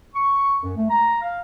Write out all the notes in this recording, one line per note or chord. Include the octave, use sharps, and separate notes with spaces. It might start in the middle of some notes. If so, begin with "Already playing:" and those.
C#6
F#2
A3
A#5
F5